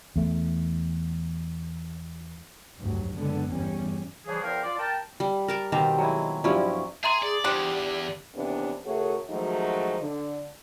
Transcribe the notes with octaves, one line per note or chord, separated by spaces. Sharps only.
E2 A3
F1 D2 G2 F#3
F#1 D3 G#3 B3
G1 E2 G3 C#4
C#3 E3 F3 G3 G#4
E2 F3 A#4 C5 F5 G5
F4 D5
A#4 G5 A5
G3
A#4 A5 D6
B2 D#3 C4 G4 C5 A#5
F#3 G#3 E4
G2 F3 F#3 C#4 E4
G#4 E5 A#5 C6
G#4 D5
E2 F3 G3 D4 G4
D#2 C3 E3 B3 C#4 D4
C#3 A3 F#4 G#4 A#4 C#5
D#3 F3 F#3 G#3 A3 D#4
D3